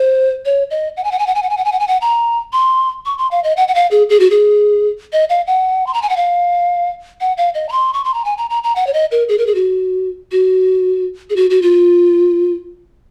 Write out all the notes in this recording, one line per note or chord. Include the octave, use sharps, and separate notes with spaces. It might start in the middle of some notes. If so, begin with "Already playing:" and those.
Already playing: C5
C#5
D#5
F#5
G#5
F#5
G#5
F#5
G#5
F#5
G#5
F#5
G#5
F#5
G#5
F#5
A#5
C6
C#6
C6
F5
D#5
F#5
F#5
F5
G#4
G#4
F#4
G#4
D#5
F5
F#5
C6
A#5
G#5
F#5
F5
F#5
F5
D#5
A#5
C6
C#6
C6
A#5
G#5
A#5
A#5
A#5
F#5
C#5
D#5
A#4
G#4
A#4
G#4
F#4
F#4
G#4
F#4
F#4
F4